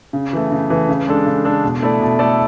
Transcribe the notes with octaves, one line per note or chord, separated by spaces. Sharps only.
C#3
E3 A3
C#3
E3 A3
C#3
G#3 D4 A4
C#3
G#3 D4 A4
B2
A3 E4 A4 D5
B2
A3 E4 A4 D5